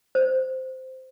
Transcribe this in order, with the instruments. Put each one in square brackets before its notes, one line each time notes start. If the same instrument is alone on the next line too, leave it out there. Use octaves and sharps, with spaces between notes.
[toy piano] C5